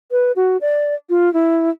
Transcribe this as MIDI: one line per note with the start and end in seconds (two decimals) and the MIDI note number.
0.12 0.32 71
0.36 0.57 66
0.61 0.95 74
1.10 1.32 65
1.34 1.70 64